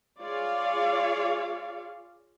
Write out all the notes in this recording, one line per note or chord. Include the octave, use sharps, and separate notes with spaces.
F4 G#4 C#5 D5 F5